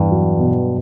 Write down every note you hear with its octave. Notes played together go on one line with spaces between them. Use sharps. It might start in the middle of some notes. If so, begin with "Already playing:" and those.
Already playing: E2 G2
F#3
B2